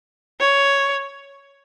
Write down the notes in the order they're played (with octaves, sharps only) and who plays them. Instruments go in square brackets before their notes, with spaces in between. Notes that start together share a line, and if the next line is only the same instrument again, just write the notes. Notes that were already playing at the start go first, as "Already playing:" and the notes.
[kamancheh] C#5